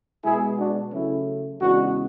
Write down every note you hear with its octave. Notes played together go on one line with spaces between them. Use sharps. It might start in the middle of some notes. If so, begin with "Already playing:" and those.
B2 G#3 B3 E4 G#4
D4 F#4
C#3 F#3 A3 C#4 E4
E2 C#3 G#3 B3 D4 F#4